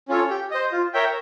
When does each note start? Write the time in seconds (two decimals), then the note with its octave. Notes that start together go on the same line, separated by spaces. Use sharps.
0.08 C#4 F4 A4 C#5
0.30 G4
0.51 C5 D#5
0.72 F4
0.94 A#4 C#5 E5 G5